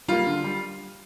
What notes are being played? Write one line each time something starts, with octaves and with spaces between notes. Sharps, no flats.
G3 A#3 F4
D3
G3